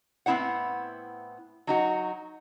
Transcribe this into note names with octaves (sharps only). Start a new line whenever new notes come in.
A2 B3 C4 E4 C#5 F#5
F#3 D#4 F#4